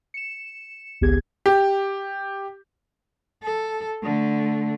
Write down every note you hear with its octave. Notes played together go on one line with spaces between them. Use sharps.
C#7 E7
G#1 C#2 B3 G4 G#4 G#6
G4
A4
D3 A3